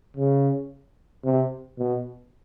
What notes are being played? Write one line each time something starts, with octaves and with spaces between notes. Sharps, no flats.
C#3
C3
B2